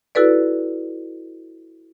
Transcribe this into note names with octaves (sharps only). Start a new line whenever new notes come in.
E4 F#4 A4 B4 D5